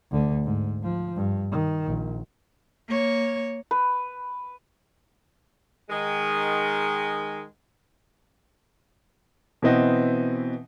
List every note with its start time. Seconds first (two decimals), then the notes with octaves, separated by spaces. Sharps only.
0.11 D2 D3
0.45 G#2
0.82 F3
1.16 G2
1.51 D#3
1.87 A#1
2.88 A#3 C#5
3.71 B4
5.90 D#3 G#3
9.62 B2 E3 B3 C4 D#5 F#5